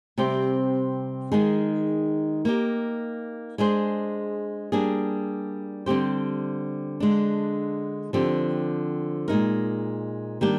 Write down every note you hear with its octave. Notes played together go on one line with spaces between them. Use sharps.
C3 G3 C4 G4 C5
D#3 G#3 D#4 G#4
A#3 D#4 G4
G#3 D4 G#4 C5
G3 A#3 D4 G#4
D3 G3 C4 G4 C5
D3 G#3 D4
D3 F3 C4 G4
A#2 G#3 D#4 A#4
D#3 G3 A#3 D4 G4